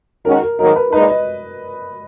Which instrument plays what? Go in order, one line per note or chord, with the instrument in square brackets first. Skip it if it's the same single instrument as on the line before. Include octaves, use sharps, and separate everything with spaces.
[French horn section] D#3 G#3 C#4 F#4 [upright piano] A#4
[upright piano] A#4
[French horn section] G#2 D#3 F#3 A#3 D#4 [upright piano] A#4
[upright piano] B4
[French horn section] A#2 G#3 D#4 [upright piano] B4
[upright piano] D#5